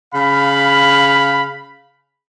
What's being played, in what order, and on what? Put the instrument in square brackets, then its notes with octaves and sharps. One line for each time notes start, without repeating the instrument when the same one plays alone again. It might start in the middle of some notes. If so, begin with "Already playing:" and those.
[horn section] C#3 F5 B5